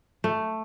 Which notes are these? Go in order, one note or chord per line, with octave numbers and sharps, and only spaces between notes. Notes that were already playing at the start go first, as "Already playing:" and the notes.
A3